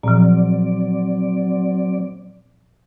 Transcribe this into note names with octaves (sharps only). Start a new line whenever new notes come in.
A#2 F3 F#3 C4 D5